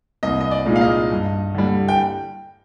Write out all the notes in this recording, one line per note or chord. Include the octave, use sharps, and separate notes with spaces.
C2 D#5
D#5
D5
A#2 G#3 D#4
F5
D#5
G2
D3 G3
G5